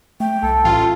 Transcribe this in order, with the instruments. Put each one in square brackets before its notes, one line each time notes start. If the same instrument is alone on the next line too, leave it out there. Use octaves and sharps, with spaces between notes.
[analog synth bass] A3 [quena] G5
[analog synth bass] C2 [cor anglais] A4
[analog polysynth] A1 F4